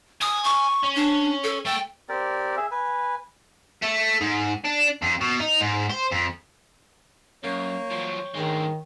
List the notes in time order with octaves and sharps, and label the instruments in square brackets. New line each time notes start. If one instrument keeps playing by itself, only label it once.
[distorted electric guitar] G#5 [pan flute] D#6
[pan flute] C#6
[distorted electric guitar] C#4
[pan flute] D4
A4
[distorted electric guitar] A3 A4 [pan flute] G5
[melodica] C4 G4 A#4 D5
G#4 E5
B4 G#5
[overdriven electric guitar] A3
G#2
D4
F2
B2
D#4
G#2
C5
F2
[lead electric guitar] F#2 [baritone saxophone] A#3 [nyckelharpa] C#5 G5
[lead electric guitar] F3 F#3
[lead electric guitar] D2 G#3 [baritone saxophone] G#2 [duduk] D#3